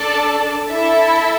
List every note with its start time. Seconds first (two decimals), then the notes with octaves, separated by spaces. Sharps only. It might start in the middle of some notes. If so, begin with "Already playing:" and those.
Already playing: D4 A4 D5 A5
0.70 E4 A4 E5